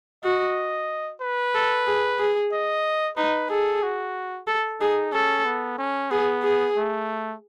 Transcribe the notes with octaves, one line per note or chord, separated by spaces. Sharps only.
F#4 D#5
B4
A4
G#4
G#4
D#5
D#4 B4
G#4 A4
F#4
A4
D#4 G#4
C#4 A4
B3
C#4
B3 G#4
G#4
A3